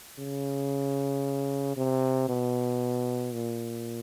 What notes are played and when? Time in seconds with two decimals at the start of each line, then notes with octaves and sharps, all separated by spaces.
0.19 C#3
1.77 C3
2.29 B2
3.34 A#2